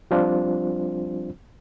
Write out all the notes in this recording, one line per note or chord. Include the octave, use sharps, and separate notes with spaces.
F3 G3 C4 D4 F4 C5